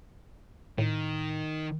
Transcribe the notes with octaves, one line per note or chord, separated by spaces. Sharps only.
A2 D#3